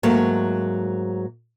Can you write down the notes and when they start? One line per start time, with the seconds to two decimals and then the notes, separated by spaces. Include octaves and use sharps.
0.03 G#2 F#3 A3 A#3